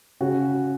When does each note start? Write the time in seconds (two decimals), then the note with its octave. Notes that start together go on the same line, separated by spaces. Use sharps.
0.21 C#3 F#4